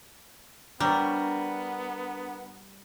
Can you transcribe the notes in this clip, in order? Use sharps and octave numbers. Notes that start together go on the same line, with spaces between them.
G3 B3 D4 A#4 C#5